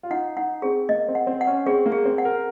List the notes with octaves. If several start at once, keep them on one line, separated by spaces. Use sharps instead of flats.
F4
D#4 F#5
D#4 F#5
C4 G#4
A#3 D#5
C4
F#5
C4
F#5
C#4
C4 G#4
A#3
G#4
C4
F#5
A#4